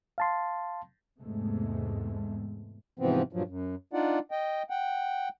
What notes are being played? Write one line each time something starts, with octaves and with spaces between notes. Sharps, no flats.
F5 A5 C6
E2 G#2 C3 G#3 A3
G#2 C3 E3 F3 B3 C4
G2 A#2 F3 F#3
F#2
D4 D#4 F4 D5 F#5
D#5 G5
F#5 G5